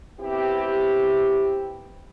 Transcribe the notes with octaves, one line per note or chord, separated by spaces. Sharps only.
B3 C4 E4 G4